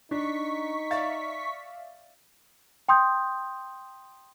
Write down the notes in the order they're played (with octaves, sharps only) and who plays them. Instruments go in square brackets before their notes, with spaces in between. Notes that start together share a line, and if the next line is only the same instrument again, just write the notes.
[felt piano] D4 [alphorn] D#4 [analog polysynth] C#6 B6
[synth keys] D5 E5 F5 [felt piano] A6
[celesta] G5 C6 D#6 G6